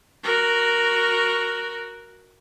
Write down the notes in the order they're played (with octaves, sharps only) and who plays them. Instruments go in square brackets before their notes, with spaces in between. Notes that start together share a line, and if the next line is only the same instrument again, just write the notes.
[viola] F#4 A#4